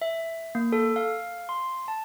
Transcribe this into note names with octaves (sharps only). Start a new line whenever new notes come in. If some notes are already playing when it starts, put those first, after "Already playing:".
E5
A#3
A4
F5
C6
A5